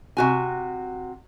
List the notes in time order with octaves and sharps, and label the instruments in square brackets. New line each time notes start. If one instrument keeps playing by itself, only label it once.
[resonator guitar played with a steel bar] C3 F#4 G#5